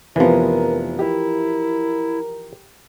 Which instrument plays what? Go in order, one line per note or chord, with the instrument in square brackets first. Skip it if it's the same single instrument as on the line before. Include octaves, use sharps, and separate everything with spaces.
[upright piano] F1 B3 [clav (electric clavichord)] E3 F3 [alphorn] A#4
[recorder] E4 [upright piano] G4 [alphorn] A#4